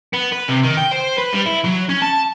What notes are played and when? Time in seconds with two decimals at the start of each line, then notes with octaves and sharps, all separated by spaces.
0.14 B3
0.33 B4
0.49 C3
0.64 D#3
0.78 G5
0.93 C5
1.18 B4
1.34 G3
1.47 E4
1.65 F#3
1.90 C#4
2.02 A5